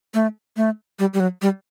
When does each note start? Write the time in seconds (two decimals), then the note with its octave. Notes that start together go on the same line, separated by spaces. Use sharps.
0.14 A3
0.57 A3
0.99 G3
1.14 G3
1.20 F#3
1.42 G3